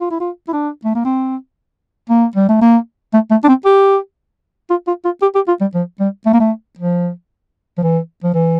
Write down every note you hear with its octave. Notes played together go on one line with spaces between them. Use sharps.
F4
E4
F4
E4
D4
A3
A#3
C4
A#3
G3
A3
A#3
A3
A3
D4
C4
G4
F4
F4
F4
G4
G4
F4
G3
F3
G3
A3
A#3
A3
F3
F3
E3
F3
E3